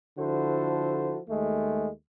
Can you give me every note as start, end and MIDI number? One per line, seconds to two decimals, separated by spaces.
0.18 1.19 50
0.18 1.19 53
0.18 1.19 64
0.18 1.19 66
0.18 1.19 69
0.18 1.19 72
1.29 1.89 39
1.29 1.89 56
1.29 1.89 57